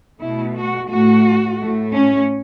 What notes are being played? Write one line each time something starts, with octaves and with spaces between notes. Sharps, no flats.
B2 A3 E4
F#4
A2 A3 F#4
A2 A3
C#4